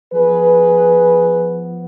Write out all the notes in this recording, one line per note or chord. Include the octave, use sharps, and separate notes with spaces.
F3 B3 G#4 B4